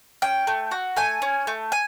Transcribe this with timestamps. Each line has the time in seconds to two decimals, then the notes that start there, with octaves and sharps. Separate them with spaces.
0.22 C#4 G5
0.47 A3
0.71 F#4
0.97 A3 G#5
1.22 C#4
1.47 A3
1.72 G#5